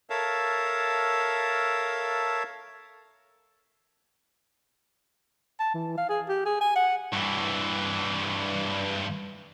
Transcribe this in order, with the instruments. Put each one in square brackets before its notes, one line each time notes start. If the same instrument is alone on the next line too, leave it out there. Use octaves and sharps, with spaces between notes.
[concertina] A4 A#4 C#5 E5 F5 A5
[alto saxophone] A5
E3
F5
G#4
G4
G#4
G#5
F#5
[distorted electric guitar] G2 E3